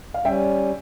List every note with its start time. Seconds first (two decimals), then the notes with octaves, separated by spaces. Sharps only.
0.14 F5
0.25 G3 C#4 E5 G5